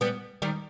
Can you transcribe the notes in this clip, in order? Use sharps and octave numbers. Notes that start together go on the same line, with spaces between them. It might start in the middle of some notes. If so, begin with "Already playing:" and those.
G3 B3
D#3 G3